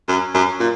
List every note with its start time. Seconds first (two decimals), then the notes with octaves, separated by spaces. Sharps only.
0.08 F#2
0.34 F#2
0.60 A#2